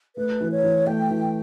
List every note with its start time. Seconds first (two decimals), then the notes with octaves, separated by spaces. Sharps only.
0.16 A3 B4
0.41 E3
0.52 C#5
0.63 E3
0.87 A3 G5
1.10 E3